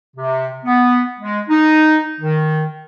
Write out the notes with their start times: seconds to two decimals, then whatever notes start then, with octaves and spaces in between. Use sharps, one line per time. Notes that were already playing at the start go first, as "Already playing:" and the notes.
0.16 C3
0.65 B3
1.20 G#3
1.49 D#4
2.20 D#3